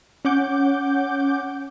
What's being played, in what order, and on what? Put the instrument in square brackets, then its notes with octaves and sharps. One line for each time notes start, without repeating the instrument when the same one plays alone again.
[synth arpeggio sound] C#4 F#5 D6 G6